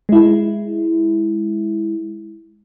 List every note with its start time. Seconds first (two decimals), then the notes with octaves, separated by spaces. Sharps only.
0.09 G#3 E4